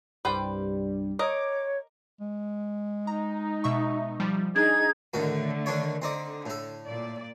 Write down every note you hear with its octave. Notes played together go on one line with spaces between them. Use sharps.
C2 G2 G3 B4 C5 G5
A#4 C#5 D#5 D6
G#3
D#4 A#5
B2 E5 C#6
F3 G3
D4 D#4 G#4 G#6
A2 D3 D#3 A3 F#4
D#3 D4 C#5
D3 C4 D#4 D5
A2 A4
A#2 D5